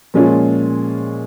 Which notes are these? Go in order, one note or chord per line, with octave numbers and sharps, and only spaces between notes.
A#2 F3 G#3 C#4 F4